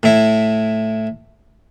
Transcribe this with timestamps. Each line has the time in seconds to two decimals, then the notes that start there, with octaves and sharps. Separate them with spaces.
0.03 A2 E4